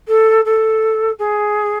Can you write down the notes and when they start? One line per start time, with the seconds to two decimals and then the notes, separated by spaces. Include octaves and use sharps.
0.08 A4
0.45 A4
1.19 G#4